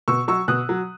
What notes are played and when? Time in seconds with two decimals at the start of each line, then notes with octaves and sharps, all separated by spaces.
0.08 B2 C#6 E6
0.28 F#3 C#6 E6
0.48 B2 D#6 F#6
0.69 F#3